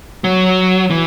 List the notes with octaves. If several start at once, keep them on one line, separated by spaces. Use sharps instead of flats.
F#3
E3